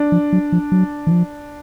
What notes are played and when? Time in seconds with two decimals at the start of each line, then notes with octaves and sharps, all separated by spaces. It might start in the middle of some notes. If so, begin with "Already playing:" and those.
Already playing: D4
0.12 F3
0.33 F#3
0.52 F3
0.72 F#3
1.07 E3
1.11 F3